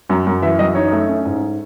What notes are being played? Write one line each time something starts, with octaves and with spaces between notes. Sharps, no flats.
F#2
F#2
E3 E5
F#2 D#5
D#4 C#5
A3
C#4
G#2